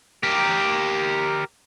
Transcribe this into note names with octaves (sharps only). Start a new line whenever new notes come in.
G4 A#4